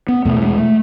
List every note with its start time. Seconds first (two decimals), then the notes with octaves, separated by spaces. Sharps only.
0.08 B3
0.25 E2 B2 A3
0.42 G#3
0.58 A3